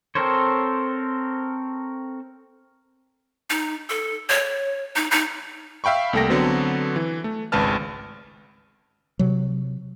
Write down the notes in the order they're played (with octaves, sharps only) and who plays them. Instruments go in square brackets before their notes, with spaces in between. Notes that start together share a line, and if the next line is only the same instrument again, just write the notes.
[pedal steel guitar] C4 A4 A#4 C5 C#5
[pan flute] D#4
A4
C#5
D#4
D#4
[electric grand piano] E5 F5 G5 B5 C#6
C2 A3 A#3 A4 G5 A#6
D3 F#3 B3 C4 F#4 A4
E3
A3
G#1 C#2 B4 A5 F6
[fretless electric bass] C3 F#3